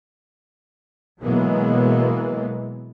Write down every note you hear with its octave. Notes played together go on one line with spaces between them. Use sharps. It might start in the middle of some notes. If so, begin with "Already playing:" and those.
B2 E3 F#3 G#3 A#3 B3